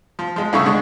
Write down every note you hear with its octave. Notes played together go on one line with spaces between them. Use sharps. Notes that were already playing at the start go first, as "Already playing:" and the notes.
F3
F3 G#3
C2 A2 C#3 A4 B5 C#6
C#2 D3 G#3 C#6